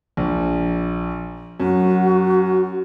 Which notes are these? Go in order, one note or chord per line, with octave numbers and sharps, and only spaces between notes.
A#1
F#2 F#4